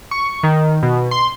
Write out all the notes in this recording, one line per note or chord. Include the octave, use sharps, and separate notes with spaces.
C#6
D#3
B2
C6